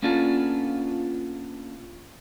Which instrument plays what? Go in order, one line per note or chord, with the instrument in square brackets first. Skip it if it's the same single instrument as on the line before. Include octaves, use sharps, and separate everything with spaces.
[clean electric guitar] A#3 B3 C#4 D4 F4 A4